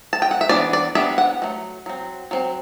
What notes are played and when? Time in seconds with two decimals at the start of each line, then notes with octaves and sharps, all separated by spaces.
0.13 A5
0.22 G5
0.31 F#5
0.41 E5
0.49 E3 B3 D4 D5
0.73 D5
0.95 G3 B3 D4 E5
1.18 F#5
1.42 F#3 A3
1.86 F#3 C4
2.31 F#3 C4